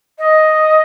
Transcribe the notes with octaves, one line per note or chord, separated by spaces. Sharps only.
D#5